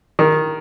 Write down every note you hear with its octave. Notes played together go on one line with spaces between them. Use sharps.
D#3